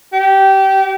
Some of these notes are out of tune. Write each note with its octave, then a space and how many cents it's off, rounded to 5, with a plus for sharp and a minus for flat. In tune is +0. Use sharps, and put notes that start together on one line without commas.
G4 -20